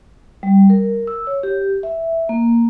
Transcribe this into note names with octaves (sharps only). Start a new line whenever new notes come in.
G3
A#4
E6
C#5
G4
E5
A#3